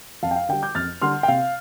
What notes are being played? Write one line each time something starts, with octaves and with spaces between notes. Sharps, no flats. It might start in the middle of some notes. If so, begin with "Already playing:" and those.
F2 F5 A5
G5
F5
D3 G3 G5
D6 G6
F2 F6 A6
D3 G3 C6 F6
G5
C3 F5